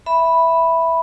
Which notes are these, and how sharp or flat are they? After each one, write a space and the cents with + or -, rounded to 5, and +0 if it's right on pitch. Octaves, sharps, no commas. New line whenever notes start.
E5 +0 B5 +0